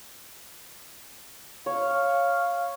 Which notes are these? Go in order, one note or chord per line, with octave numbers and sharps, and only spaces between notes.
C#5 F5